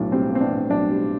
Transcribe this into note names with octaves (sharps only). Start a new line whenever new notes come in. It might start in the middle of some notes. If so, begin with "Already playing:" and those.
Already playing: B1 A2 B3 D4
G3 C4
B3 C4
D4
A2
B1 D4
G3